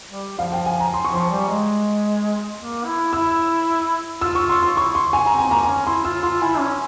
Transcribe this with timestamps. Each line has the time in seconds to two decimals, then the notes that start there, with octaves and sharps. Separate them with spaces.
0.11 G3
0.38 F3 F5
0.52 G5
0.66 G#5
0.80 A#5
0.94 C6
1.04 C#6
1.11 F3 C6
1.30 G3
1.48 G#3
2.58 A#3
2.85 E4
3.13 E4 E6
4.21 F4 E6
4.35 C#6
4.49 C6
4.63 C6
4.76 E4 C#6
4.95 C6
5.13 G#5
5.26 C4 A#5
5.38 G#5
5.50 A#3 A#5
5.63 C#4 G#5
5.86 E4 C6
6.05 F4 E6
6.22 F4 C6
6.41 E4 G#5
6.59 C#4